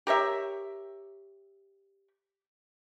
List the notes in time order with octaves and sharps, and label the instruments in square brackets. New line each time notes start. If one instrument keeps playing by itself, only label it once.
[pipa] G4 A#4 C#5 E5